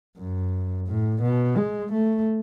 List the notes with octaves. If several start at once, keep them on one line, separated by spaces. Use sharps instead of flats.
F#2
A2
B2
G#3
A3